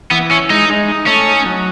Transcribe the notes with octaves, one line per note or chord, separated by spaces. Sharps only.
E3 B3
C#4 E4
G#3 D#4
G#3
D#4
A3 C#4
D#4
F#3